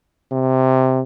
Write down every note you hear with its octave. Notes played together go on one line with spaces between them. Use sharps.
C3